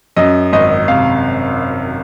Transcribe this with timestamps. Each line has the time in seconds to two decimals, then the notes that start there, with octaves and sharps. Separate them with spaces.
0.17 F#2 D#5
0.52 G#1 D#5
0.88 C3 F5